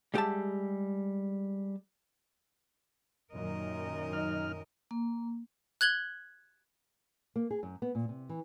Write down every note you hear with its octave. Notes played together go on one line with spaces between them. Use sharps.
G3 G#3 G4 D#5 E5 A5
F#2 A#2 D#3 A#4 D#5
D#4 F6
A#3
F#6 G#6 F#7 G7
A#3
G#4
F#2
B3
A#2
C3
E3